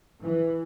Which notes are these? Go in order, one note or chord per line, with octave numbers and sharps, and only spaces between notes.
E3